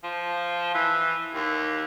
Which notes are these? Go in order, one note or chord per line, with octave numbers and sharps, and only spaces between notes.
F3
E3
D#2